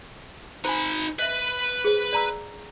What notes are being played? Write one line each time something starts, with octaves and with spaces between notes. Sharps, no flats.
D#4 C5 G#5 B5
B4 D#5 E5
G#4 C5
D5 A#5 E6